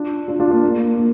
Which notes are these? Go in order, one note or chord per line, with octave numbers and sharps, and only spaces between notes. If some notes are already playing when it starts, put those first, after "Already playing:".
Already playing: D4 F4
D4 F4
D4 F4
A#3 D4
A#3
A#3